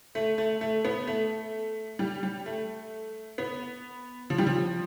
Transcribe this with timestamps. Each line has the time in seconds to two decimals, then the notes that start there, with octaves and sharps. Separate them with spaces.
0.15 A3
0.38 A3
0.61 A3
0.85 B3
1.07 A3
1.99 G3
2.23 G3
2.46 A3
3.38 B3
4.30 F3
4.38 G3
4.47 F3